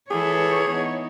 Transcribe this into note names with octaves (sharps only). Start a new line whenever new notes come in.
E3 G#4 A4 B4 C#5
E3 B3 D#4